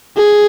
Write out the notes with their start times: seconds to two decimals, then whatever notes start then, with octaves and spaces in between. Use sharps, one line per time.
0.17 G#4